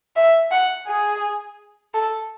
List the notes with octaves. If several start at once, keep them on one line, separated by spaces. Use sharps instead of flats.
E5
F#5
G#4
A4